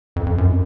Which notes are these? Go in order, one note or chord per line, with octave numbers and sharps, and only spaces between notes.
F2
F2
F#2